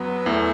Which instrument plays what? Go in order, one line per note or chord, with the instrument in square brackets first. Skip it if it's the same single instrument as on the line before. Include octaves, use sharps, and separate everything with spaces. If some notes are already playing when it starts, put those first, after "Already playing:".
Already playing: [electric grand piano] F#2 F#3 [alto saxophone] B3
[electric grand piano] E2 E3 [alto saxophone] A3